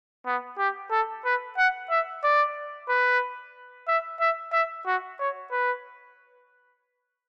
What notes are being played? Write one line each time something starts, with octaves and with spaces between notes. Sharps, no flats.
B3
G4
A4
B4
F#5
E5
D5
B4
E5
E5
E5
F#4
C#5
B4